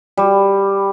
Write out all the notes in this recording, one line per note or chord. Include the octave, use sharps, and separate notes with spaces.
G3